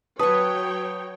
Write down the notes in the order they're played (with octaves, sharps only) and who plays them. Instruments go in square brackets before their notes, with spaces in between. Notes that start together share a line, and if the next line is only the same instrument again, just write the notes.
[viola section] F#3 C#5 G5 [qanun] B4 C#6 [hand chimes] A5 D#6